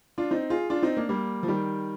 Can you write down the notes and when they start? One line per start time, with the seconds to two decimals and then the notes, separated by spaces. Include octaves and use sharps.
0.18 D4 F4
0.31 C4 D#4
0.50 F4 G#4
0.70 D4 F4
0.82 C4 D#4
0.97 A#3 D4
1.09 G3 A#3
1.43 F3
1.48 D#3 G3